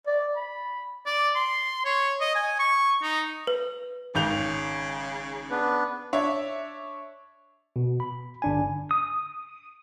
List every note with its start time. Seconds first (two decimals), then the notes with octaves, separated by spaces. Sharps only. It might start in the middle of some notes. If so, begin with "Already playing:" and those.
0.07 D5
0.36 B5
1.06 D5
1.35 C6
1.85 C#5
2.20 D#5
2.36 G#5
2.59 C#6
3.02 D#4
3.47 B4
4.15 G#1 C#3 G6 F7
5.50 B3 D4 B4
6.13 D4 C#5 E5
7.76 B2
8.00 B5
8.42 G1 D4 G#5
8.91 D#6